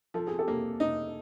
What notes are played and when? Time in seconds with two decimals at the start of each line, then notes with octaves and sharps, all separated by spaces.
0.14 F3 A4
0.27 G#4
0.38 G4 A4
0.48 A#3
0.80 D#4